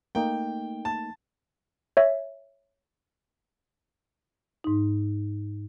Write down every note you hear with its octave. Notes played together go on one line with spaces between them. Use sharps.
A3 A#3 D#4 G5
A5
C#5 E5
G#2 D#4